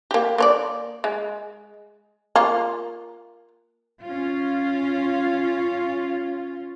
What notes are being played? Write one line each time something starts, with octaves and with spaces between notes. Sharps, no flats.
A#3 G4
A#3 C#5 D5
G#3
A#3 F4
C#4 F4